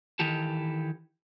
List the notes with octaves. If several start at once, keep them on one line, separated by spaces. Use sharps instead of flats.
D#3 E3 G4 A4